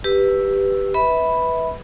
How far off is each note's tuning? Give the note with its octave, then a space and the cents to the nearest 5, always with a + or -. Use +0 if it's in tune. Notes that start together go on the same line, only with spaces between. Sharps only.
G4 +5 B4 +0 E6 +0
B4 +0 E5 -30 B5 +0